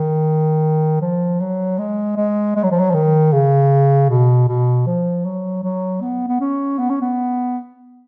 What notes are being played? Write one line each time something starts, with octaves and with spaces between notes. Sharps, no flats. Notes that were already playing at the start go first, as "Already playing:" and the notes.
Already playing: D#3
F3
F#3
G#3
G#3
G#3
F#3
F3
F#3
F3
D#3
C#3
B2
B2
F3
F#3
F#3
B3
B3
C#4
B3
C#4
B3